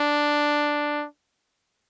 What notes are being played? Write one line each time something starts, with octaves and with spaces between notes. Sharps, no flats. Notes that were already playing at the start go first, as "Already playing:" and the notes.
Already playing: D4